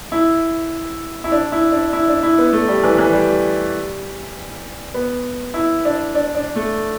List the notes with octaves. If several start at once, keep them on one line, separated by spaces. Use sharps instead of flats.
E4
E4
D4
E4
D4
E4
D4
E4
B3
A3
G3
E3
E3
G3
B3
E4
D4
D4
D4
A3